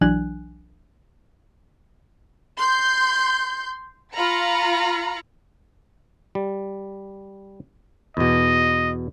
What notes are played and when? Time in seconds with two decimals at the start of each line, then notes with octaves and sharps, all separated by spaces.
0.01 B1 E3 F#3 D4 G#5 F#6
2.57 C6 G6
4.16 F4 F5 A#5 B5 C#7
6.35 G3
8.17 E2 B2 D#5